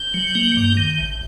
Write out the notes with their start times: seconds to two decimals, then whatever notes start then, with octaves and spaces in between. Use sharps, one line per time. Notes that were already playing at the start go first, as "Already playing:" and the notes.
Already playing: G6
0.14 F#3
0.35 A#3
0.57 G2
0.77 D#3
0.98 A1